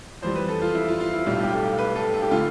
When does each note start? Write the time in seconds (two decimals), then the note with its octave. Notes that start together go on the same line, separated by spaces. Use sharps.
0.22 F2 E3 G3 C5
0.35 B4
0.48 A4
0.62 F4
0.74 E4
0.88 F4
1.00 F4
1.13 E4
1.26 B1 A2 G3 F4
1.43 G4
1.53 A4
1.78 B4
1.96 A4
2.13 A4
2.22 G4
2.31 D3 A3 F4